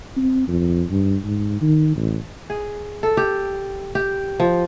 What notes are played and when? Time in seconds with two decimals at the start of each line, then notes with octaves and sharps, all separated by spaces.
0.16 C4
0.48 F2
0.91 G2
1.24 G#2
1.61 D#3
1.96 A1
2.50 G#4
3.03 A4
3.17 G4
3.95 G4
4.40 F3